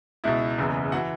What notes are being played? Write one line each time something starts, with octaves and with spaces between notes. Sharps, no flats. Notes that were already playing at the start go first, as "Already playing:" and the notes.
C#2 B2 E4 E5
F#1 E2 C#3 E3
E3 F#4 F#5